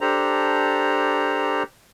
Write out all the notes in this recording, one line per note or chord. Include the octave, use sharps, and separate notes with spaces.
D4 G4 A4 C5 A#5